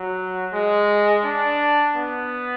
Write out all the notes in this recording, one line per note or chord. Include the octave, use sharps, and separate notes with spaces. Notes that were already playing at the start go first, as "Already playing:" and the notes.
Already playing: F#3
G#3
D4
B3